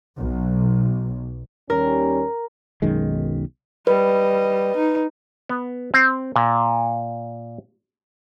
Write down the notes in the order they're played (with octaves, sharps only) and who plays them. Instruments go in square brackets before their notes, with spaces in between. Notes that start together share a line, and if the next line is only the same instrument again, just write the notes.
[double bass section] B1
[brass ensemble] D#2 G3 C#4 [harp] A#4
[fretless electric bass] B1 F#2 D#3 G#3
[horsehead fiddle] G3 D#5 [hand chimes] B4
[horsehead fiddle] D#4
[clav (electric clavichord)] B3
C4
A#2